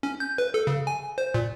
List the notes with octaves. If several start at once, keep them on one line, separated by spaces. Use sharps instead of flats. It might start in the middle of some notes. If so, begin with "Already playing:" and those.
C#4
G6
B4
A4
C#3
G#5
C5
A#2